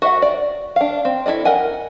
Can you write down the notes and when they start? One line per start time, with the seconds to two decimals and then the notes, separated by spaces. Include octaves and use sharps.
0.02 F#4 D#5 E5 F#5
0.22 D5
0.76 D4 F5
1.05 C4
1.26 E4 A4 D5 D#5
1.45 A#4 D#5 F#5 G#5